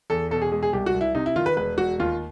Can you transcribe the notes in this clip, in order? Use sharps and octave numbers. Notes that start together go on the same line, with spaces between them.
E2 A4
B2 A4
G#4
G#3 G#4
G#4
C2 G4
F#4
C2
E4
C3 D#4
E4
D#3 F4
B4
E1 B4
E1 F#4
D#2 F4